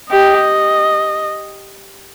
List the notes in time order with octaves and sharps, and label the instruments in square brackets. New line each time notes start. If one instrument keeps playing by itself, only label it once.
[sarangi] G4 [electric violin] D#5